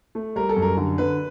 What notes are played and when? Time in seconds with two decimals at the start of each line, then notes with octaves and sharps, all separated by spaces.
0.15 A3
0.36 G3 A#4
0.49 A4
0.56 F#2
0.62 A#4
0.77 D3
0.98 D3 B4